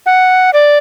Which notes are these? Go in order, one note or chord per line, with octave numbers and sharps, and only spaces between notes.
F#5
D5